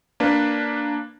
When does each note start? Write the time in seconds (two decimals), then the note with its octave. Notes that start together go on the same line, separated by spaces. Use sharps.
0.20 A#3 D4 B4